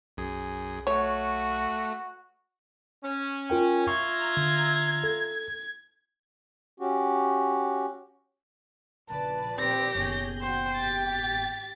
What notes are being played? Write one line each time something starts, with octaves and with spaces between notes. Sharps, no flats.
B1 F#2 G#4
A3 F#4 C#5
C#4
F4 A#4 G5
F4 E5 A#5 C#6 G#6
D3
A4
C#4 F#4 G4
A#1 C#3 E3 B4 D5 A5
D#3 C4 G4 A#6
F#1 B2 D#3 G#4 C#5 G6
F#4 C5 G5
G#1 G4 A6 B6